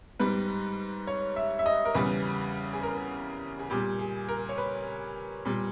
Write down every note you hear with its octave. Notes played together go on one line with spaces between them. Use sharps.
G#2 G3 B4
C#5
E5
E5
D#5
A#4
E2 C#3 G3 B4
G#4
A#4
G#4
A#2 G3 G4
G#4
A#4
C#5
B4
A#2 G3